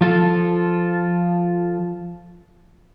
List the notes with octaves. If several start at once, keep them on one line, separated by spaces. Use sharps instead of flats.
F3 F4 A4